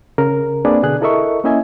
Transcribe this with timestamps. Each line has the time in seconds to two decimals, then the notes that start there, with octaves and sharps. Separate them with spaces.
0.18 C#3 A#4
0.65 A#3 C4 D4 G#4 B4 D5
0.83 B2 D3 G#4 F#6
1.01 E4 A4 A#4 D#5 E5 C#6
1.44 A#3 C#4 E4 D#5 E5 G#5